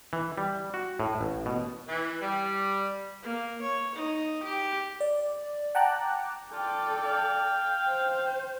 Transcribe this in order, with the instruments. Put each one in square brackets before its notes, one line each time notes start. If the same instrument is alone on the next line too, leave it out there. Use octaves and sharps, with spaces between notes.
[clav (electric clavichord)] E3
G3
F#4
A2
A1
B2
[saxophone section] E3
G3
[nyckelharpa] A#3
C#5
D#4
G4
[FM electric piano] D5
F#5 G5 A5 A#5 D6 F#6
[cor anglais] F4 [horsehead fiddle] A4 D5 [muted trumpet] G5
[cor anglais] F5
[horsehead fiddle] C5